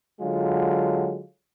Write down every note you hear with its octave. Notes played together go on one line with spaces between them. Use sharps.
D3 F#3 G#3 F4